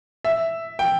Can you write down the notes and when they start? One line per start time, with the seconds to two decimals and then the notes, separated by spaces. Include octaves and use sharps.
0.24 E5
0.79 G5